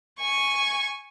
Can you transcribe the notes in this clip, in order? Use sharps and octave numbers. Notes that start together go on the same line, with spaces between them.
G#5 C#6